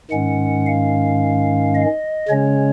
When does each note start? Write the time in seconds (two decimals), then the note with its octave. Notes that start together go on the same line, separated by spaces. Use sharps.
0.11 G#2 D#3 G#3 C#4 F#5
0.66 F5
1.75 D#5
2.29 C#3 G#3 C#4 C#5